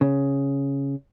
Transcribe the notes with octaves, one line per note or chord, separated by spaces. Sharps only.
C#3